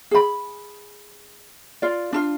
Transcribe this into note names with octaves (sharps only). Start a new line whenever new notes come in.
G#4 B5
F4 D5
D4 E4 F4